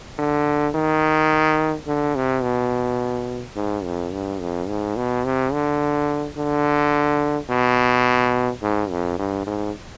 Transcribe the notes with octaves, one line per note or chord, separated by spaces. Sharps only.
D3
D#3
D3
C3
B2
G#2
F2
G2
F2
G#2
B2
C3
D3
D3
B2
G#2
F2
G2
G#2